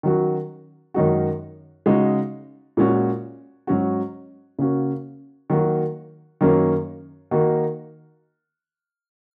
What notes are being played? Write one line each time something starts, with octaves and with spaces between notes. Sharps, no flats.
D#3 F#3 C#4 F#4
F#2 D#3 G#3 D#4 F#4
C#3 G#3 D#4 F#4
A#2 G#3 C#4 F#4
G#2 F#3 C#4 F#4
C#3 A#3 C#4 F#4
D#3 F#3 A#3 F#4
F#2 D#3 F#3 A#3 C#4
D#3 A#3 D#4 F#4